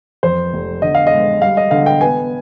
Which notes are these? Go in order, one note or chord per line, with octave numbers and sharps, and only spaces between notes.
F2 C5
F1
D3 D#5
F5
D#5
G#3
G3 F5
D#5
D3 F5
G5
B3 G#5